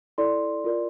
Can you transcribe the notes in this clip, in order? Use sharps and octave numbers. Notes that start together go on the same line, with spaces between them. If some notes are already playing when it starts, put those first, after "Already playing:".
E4 A4 D5 C6
F4 A#4 D5